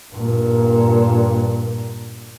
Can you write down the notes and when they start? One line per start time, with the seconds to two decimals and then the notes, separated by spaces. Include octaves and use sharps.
0.13 G2 A#2